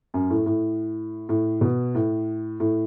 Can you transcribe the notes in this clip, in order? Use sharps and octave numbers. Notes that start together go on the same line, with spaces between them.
F#2
A2
A2
A2
B2
A2
A2